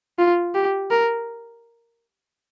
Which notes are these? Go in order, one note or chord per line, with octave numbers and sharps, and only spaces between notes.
F4
G4
A#4